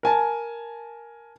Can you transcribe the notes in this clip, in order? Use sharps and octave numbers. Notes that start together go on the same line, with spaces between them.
A#4 G#5 A5